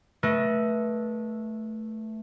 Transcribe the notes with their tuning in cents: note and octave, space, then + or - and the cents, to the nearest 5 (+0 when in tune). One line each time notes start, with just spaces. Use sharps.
A3 +0 B4 -30 D#5 +15